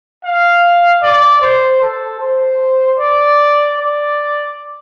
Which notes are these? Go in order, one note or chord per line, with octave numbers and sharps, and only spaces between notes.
F5
D5
C5
A4
C5
D5
D5